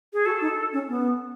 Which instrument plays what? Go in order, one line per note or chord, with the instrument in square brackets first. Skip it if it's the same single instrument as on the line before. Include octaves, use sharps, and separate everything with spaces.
[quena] G#4
[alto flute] F#4 [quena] A4
[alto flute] D#4
C#4
B3